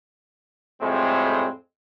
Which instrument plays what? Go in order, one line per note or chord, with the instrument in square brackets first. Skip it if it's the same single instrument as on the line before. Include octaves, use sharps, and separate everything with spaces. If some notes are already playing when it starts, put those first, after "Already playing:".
[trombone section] F2 A2 G3 G#3 C4